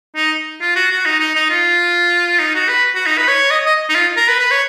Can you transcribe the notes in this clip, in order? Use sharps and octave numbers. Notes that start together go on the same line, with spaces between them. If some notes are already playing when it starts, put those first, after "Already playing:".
D#4
F4
F#4
F#4
D#4
D#4
D#4
F4
D#4
F#4
B4
F#4
D#4
B4
C#5
D#5
D#5
D#4
F4
A#4
B4
B4
C#5